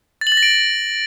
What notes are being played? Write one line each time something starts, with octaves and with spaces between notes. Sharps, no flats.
A6
F#7
A6
A#6
D7